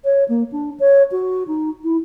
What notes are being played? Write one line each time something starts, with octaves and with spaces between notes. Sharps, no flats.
C#5
A#3
D4
C#5
F#4
D#4
E4